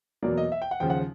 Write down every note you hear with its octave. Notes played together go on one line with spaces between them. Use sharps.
E2 B2 F#3 A#3 D5
D#5
E5
G5
F#5
D#2 C#3 F3 G5
F#5